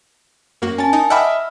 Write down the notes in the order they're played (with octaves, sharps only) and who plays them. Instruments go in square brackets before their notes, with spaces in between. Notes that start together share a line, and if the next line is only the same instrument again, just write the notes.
[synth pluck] F#2 A#3 F#4 [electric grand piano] A#4
[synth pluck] C#4 A6 [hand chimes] G#5 A5
[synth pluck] D#4
[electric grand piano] D#5 E5 B5 [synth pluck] F#5 G5 D6 [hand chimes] E6 F6